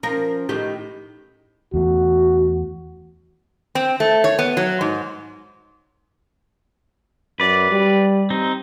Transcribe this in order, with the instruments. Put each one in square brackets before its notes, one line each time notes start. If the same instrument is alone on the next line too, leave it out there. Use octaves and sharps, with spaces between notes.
[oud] F3 A#4 [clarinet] C#4
[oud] A2 D#3 G4
[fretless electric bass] E2 A3 [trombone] F#4
[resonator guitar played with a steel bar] C4
A3
C#5
B3
F#3
G#2
[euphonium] F#2 [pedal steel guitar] B4 D5
[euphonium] G3
[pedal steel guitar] C4 D#4